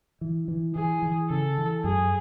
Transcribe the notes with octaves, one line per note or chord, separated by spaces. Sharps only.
E3
E3
E3 G#4
E3
C#3 A4
E3
F#2 G#4